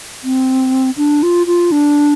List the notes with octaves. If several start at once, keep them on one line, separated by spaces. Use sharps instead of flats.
C4
D4
F4
F4
D4